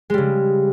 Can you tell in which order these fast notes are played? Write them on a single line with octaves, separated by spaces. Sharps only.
G#3 G3 C#3